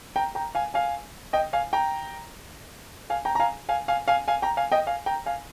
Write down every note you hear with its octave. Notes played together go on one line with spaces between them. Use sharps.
G5 A#5
G5 A#5
F5 G#5
F5 G#5
D#5 G5
F5 G#5
G5 A#5
F5 G#5
G5 A#5
A#5
F5 G#5
F5 G#5
F5 G#5
F5 G#5
F5 G#5
G5 A#5
F5 G#5
D#5 G5
F5 G#5
G5 A#5
F5 G#5